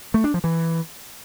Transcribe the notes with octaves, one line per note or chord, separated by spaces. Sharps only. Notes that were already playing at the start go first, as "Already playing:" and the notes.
A3
D4
F3
E3